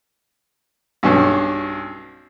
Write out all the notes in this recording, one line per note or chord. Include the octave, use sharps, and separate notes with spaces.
B1 G2 C#4